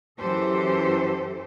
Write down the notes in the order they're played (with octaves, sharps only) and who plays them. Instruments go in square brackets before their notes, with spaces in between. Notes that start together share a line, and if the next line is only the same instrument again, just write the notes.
[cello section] F#2 E3 F#3 G4 A4 C5